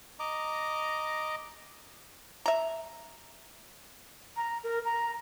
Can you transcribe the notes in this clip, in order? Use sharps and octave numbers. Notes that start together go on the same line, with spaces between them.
D#5 A#5 D6
E5 A#5
A#5
A#4
A#5